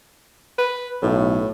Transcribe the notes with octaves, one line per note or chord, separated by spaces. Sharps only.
B4
B1 A2